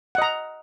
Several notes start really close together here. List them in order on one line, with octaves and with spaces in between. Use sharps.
F#5 D#5 A#5